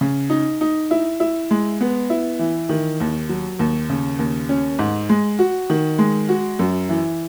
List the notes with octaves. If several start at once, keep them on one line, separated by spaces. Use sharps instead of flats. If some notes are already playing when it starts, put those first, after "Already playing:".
C#3
D#4
D#4
E4
E4
G#3
B3
E4
E3
D#3
D#2
F#3
D#2
C#3
D#2
C#4
G#2
G#3
F#4
D#3
G#3
F#4
F#2
E3